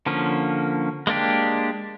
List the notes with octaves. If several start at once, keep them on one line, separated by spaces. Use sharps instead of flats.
D3 F3 A#3 C#4
G#3 A#3 D4 G4